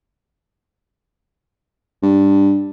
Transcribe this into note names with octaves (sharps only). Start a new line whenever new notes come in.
G2